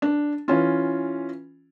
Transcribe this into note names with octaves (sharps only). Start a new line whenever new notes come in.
D4
E3 C#4 F4